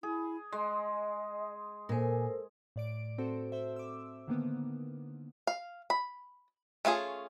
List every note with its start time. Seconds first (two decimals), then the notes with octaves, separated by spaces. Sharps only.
0.03 E4 G#4
0.53 G#3 D#5 C6
1.89 A#2 A4 A#4 C5 G#5
2.76 A2 D5 D7
3.18 C4 F#4 A4 C5
3.52 C5 E5
3.76 D6 E6
4.28 D3 D#3 A#3 B3
5.47 F5
5.90 B5
6.85 A3 C#4 F4 G#4